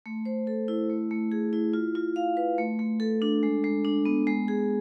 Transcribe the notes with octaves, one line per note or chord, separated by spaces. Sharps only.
A3
C5
A4
E4
A3
A3
G#4
E4
F4
F4
F5
B4
A3
A3
A4
D4
G#3
G#3
D4
B3
G#3
G#4